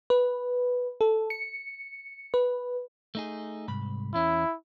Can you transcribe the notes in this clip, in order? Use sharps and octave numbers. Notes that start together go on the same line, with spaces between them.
B4
A4
C#7
B4
A3 D#4 G#4
C2 G#2 B5
E2 C#4 E4